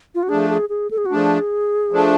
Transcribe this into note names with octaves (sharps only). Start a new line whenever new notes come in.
F4
F#4
F3 A3 D4 G#4
G#4
G#4
A4
G#4
F#4
F3 A3 D4 G#4
F3 A3 D4